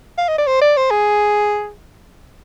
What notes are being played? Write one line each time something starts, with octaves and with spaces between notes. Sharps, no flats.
F5
D#5
D5
C5
D5
C5
G#4